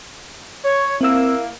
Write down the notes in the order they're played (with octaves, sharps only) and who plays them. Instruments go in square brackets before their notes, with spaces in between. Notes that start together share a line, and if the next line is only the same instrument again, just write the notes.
[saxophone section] C#5
[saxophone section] A#3 E4 [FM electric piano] C4 E6